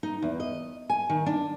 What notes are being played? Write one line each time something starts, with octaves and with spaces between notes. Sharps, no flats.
D#4
E2
D#5
G#5
D#3
D4